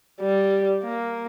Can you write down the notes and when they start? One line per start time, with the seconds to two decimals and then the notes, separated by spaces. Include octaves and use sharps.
0.21 G3
0.84 A#3